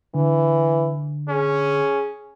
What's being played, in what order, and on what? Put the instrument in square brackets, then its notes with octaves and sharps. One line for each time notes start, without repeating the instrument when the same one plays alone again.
[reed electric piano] D3 [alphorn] E3
[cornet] C#4 [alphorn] G#4